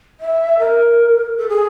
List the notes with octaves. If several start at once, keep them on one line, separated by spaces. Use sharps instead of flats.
E5
A#4
A4
G#4